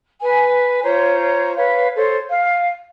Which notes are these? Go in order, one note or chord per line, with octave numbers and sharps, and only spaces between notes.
B4 G#5
F4 C5 C#5 A#5
B4 C#5 F5
A4 C5 C#5
F5